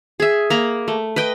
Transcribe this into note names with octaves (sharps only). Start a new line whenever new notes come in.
G#4 E5
A#3 A#5 B5
A3
B4 D#5 G5